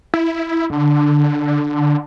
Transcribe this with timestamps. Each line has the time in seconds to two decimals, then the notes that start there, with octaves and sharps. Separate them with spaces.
0.14 E4
0.70 D3 D4